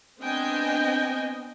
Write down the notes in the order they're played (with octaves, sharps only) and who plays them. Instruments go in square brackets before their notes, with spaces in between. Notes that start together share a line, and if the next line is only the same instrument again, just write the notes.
[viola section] B3 C4 D4 D#5 G5 G#5